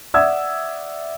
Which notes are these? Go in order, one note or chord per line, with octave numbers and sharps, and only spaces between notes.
D5 E5 F#5 D#6 E6 G#6